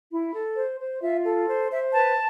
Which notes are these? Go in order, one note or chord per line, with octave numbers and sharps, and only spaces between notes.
E4
A4
C5
C5
F4 E5
A4
C5
C5 E5
B4 A5